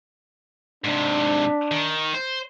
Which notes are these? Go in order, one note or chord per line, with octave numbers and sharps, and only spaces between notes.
G#2 C3 D4
D#3
C5